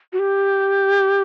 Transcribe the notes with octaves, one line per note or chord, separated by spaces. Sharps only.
F#4
G4